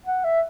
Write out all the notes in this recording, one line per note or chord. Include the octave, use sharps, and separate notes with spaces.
F#5
E5